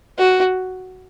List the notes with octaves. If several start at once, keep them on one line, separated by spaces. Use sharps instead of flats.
F#4